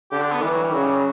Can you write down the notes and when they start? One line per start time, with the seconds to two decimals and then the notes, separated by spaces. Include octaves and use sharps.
0.11 D3 G4
0.22 D4
0.32 B3
0.42 E3 G3
0.53 F#3
0.63 G3
0.74 C#3 F#3
0.84 G3
0.94 F#3